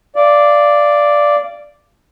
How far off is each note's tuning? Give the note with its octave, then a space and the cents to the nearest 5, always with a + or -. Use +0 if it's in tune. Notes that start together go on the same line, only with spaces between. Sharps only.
D5 +0 F5 -20